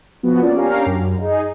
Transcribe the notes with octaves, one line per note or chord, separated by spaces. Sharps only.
F3 B3 F#4
A#3 C#4 F4 D5
C#4 D4 G4 A#4 F5 A#5
F#2
D#4 G#4